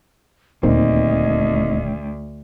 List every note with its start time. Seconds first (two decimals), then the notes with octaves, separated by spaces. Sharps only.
0.63 D#1 D2 D#3 A#3 C4 D#4 D#5